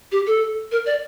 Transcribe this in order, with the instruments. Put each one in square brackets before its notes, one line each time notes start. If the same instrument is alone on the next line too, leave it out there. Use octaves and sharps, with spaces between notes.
[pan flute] G4
A4
A#4
D5